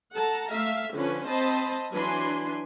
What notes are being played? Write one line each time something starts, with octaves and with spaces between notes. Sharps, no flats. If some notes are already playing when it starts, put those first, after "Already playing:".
A4 F#5 A5 A#5
A3 E5 F5
D3 F3 C#4 D4 B4
C4 C5 D#5 A5 B5
E3 F#3 D4 B4 G#5 C6